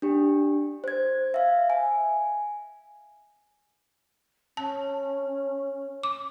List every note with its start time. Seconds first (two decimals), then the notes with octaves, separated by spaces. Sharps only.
0.02 D4 G4
0.84 C5 G#6
1.34 E5 F5
1.70 G#5
4.57 C#4 A5
6.03 D6